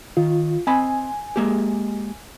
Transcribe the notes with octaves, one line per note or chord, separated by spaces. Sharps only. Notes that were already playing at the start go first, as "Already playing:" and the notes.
D#3 F4
C4 D#5 G#5 B5
G#3 A#3 G4